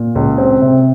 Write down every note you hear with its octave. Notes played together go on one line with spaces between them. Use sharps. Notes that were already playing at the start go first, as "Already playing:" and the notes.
Already playing: A#2
C#2
C4
C3